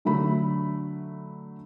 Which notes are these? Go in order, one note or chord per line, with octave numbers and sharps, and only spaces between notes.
D3 F#3 A3 B5